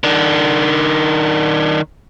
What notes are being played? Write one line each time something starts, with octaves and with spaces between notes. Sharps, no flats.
D#3 D4